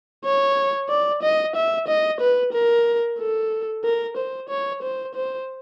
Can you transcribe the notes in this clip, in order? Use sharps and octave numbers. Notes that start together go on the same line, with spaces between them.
C#5
D5
D#5
E5
D#5
B4
A#4
A4
A#4
C5
C#5
C5
C5